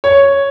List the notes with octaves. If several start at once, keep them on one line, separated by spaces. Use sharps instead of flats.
C#5